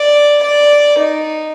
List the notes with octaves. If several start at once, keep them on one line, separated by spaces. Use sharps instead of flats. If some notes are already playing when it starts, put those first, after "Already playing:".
Already playing: D5
D5
D#4